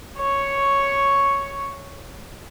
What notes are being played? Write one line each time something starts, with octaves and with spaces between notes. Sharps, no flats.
C#5 C#6